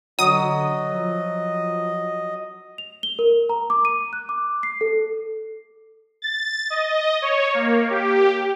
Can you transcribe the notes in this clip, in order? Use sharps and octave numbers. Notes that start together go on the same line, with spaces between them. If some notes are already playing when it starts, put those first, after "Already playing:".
D3 F#3 D#5 D#6
F3
F7
G7
A#4
A#5
D6
D#7
F#6
D6
C7
A4
A6
D#5
C#5
A#3
G4